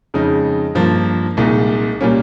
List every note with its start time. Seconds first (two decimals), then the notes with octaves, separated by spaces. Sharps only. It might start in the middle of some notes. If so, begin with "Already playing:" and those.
0.14 F2 C#3 G#3 D#4
0.75 G2 F3 A#3
1.37 C2 A#2 G#3 D#4
2.01 A#2 G3 A#3 C#4